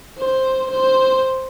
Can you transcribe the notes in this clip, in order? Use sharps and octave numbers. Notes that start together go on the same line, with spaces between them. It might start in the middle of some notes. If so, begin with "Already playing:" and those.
C5
C5